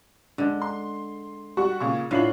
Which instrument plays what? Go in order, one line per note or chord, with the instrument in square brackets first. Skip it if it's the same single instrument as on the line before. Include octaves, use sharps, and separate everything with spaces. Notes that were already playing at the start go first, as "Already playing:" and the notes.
[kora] D3 G#3
[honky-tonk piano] C6
G3 F#4 C#6
A#2 C#3 C#6
[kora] A2 D3 [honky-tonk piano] F4 C7 F#7